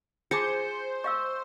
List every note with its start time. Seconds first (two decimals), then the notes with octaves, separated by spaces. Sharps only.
0.31 F4 G#4 C5 A5 D6 C#7
1.04 D#5 F5 C#6 E6